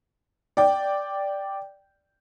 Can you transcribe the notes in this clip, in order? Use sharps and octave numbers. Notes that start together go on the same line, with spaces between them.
D5 G5